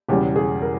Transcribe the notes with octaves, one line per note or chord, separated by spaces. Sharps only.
E1 E2 C#3 G3 G4
G#4
A#4